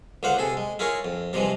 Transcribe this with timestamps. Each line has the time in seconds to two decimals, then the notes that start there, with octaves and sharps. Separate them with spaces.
0.23 C#2 D3 C5 F5 F#5
0.38 C3 G#4 A4
0.57 G#3
0.79 E4 F4 G#4 A#4 C#5
1.05 F2
1.33 G2 C3 E3 F3 G#3